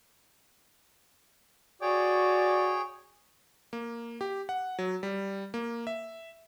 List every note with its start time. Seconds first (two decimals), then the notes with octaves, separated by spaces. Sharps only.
1.82 F#4 G#4 C#5 D5 G5
3.73 A#3
4.21 G4
4.49 F#5
4.79 F#3
5.03 G3
5.54 A#3
5.87 E5